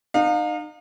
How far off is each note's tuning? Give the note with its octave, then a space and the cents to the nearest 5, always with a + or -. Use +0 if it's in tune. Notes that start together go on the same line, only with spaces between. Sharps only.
D#4 -30 F5 +30